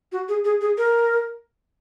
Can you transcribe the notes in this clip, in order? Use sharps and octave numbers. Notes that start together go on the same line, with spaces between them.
F#4
G#4
G#4
G#4
A#4